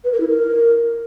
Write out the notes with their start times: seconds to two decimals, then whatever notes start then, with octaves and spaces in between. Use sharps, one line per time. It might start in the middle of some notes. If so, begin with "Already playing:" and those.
0.04 B4
0.12 A#4
0.20 E4
0.29 A#4